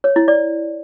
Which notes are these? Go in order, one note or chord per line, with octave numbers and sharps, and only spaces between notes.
C#5
E4
D5